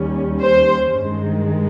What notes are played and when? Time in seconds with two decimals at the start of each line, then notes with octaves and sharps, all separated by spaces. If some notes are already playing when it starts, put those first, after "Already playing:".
Already playing: D#2 D#3 G3 C#4
0.42 C5
0.96 G2 D#3 G#3